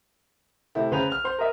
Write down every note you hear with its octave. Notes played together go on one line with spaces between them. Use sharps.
C3 A3 E4
C#3 B4 C5 A#5 F7
F6 F7
C5 C6
A#4 D#5 E5